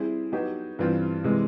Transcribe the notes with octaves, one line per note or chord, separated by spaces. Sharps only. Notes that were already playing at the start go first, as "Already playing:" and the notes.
Already playing: G3 C4 E4 G#4
F#3 B3 D#4 G4
G2 E3 G3 C4 F4
C3 E3 G#3